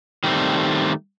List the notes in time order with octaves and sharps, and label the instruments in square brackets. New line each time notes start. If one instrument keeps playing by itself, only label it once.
[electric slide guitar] D#3 G3 A3 C4